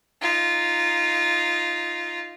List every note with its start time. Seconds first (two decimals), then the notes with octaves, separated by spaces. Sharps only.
0.21 D#4 F4